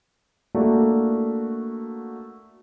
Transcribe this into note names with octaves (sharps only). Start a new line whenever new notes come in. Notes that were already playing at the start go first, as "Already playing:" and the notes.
A3 A#3 D4 E4 F#4